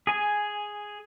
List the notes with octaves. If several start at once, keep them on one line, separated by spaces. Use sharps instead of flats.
G#4 G#5